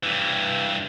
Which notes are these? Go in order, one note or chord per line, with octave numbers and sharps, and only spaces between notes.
G2 E3